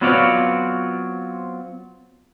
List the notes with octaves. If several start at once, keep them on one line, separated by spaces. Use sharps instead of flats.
F#3 B3 C4 F4 C#5 D5